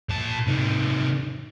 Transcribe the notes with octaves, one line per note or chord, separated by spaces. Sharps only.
A#2 A5
C3 D#3